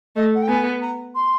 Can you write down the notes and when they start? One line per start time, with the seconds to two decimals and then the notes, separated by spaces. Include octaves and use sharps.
0.16 A3 D#5
0.35 F#5
0.42 G5
0.48 B3 G#5
0.81 A#5
1.15 C6